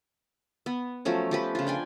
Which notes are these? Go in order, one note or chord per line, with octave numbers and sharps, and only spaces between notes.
B3
F3 F#3 A3 C#4
F3 G4 B4
C#3 F4
D4 G5 G#5